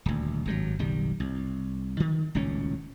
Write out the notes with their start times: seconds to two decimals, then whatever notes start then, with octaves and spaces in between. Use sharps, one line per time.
0.06 D#1 D2
0.46 G#1 G2 C3 F#3
0.79 F#1 B1 D#3 G3
1.20 C2
2.00 D#3
2.35 D#1 C#2 A2 C#4